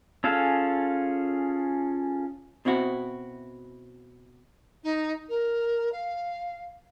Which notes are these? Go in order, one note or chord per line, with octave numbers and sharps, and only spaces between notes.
C#4 F4 G#4 A4 F5
B2 C4 E4 F#4
D#4
A#4
F5